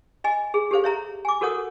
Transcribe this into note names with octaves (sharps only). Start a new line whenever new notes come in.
D#5 G#5
G#4
G4 A4 C5 F5
C#5 E5 A#5
G#5 D6
F#4 A4 A#4 C#5 F#5 D#6